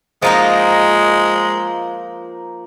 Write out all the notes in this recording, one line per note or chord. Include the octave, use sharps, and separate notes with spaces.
F3 G#3 A#3 D#4